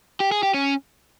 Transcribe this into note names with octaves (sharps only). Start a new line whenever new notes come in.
G4
G#4
G4
C#4